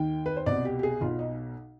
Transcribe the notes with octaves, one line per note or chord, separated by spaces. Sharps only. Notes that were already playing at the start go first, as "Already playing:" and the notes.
Already playing: D#2 D#3 G5
B4
C5
C2 B2 D5
G4
G4
G#4
B1 B2 F4
D#4